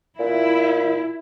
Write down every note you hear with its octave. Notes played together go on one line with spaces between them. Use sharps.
A#2 E4